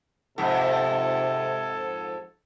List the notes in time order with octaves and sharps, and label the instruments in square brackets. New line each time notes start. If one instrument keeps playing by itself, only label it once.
[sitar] F2 G#2 [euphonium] C3 [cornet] A4